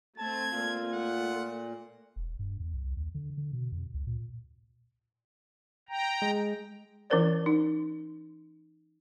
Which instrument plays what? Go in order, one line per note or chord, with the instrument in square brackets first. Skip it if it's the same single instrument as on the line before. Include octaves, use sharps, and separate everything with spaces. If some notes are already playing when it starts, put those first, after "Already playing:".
[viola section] A3 C4 [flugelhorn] A5 [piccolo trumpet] G#6
[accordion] A#2 [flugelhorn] F4
[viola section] A3 [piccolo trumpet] F#5
[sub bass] E1
G2
E2
C2
D#2
D3
D3
B2
F2
C#2
A#2
[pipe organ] G5 A#5
[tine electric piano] G#3
[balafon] E3 C#4 E4 A#4 C5 D5
D#4